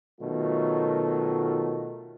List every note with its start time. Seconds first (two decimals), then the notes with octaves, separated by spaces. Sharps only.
0.21 B2 D#3 F#3 A3 F4